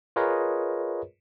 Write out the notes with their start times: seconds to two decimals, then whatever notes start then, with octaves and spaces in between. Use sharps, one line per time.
0.16 F4 G#4 A#4 B4 C#5 D#5